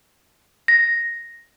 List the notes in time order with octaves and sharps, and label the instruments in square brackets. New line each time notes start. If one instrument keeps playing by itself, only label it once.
[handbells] A#6